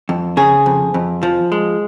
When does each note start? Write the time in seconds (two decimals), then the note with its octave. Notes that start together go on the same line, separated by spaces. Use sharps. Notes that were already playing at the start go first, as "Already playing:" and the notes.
0.09 F2
0.37 C#3 G#4
0.66 F2
0.94 F2
1.23 F3
1.52 G#3